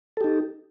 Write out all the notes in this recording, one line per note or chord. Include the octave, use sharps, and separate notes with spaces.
D#4 G4 A4